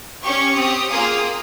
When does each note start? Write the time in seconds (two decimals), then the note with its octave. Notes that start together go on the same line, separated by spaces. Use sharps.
0.23 C#4 G4 C#6
0.56 C4 G4 D#6
0.88 A#3 F4 G#4 D#6